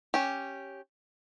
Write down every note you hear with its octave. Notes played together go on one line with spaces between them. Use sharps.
C#4 G4